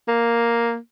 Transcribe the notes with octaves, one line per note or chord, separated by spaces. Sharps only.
A#3